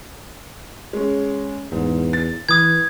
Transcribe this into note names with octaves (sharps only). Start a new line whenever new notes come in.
G#3 C#4
E2 G#2
A6
E3 B4 D#6 G#6